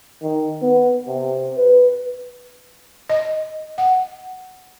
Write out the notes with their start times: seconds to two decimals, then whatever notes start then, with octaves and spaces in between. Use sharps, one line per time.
0.22 D#3
0.62 B3
1.07 C3
1.57 B4
3.09 D#5
3.78 F#5